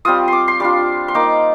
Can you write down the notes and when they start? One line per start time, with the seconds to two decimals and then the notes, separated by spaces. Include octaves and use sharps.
0.05 G3 C4 F4 D#6
0.28 C6 D6
0.48 C6
0.60 G3 D4 F4 D6
1.08 C6
1.14 A#3 D#4 D6